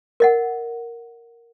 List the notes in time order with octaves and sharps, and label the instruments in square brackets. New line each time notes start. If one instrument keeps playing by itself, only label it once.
[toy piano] A#4 D#5 F#5